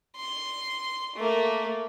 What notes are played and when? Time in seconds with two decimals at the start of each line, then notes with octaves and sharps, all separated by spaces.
0.17 C6
1.16 A3 A#3